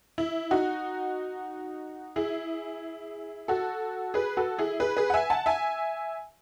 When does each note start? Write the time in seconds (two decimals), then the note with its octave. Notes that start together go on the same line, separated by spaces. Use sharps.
0.18 E4
0.51 D#4 F#4
2.16 E4 G#4
3.48 F#4 A4
4.14 G#4 B4
4.37 F#4 A4
4.59 E4 G#4
4.80 G#4 B4
4.97 G#4 B4
5.10 F#5
5.14 E5 G#5
5.30 F#5 A5
5.46 E5 G#5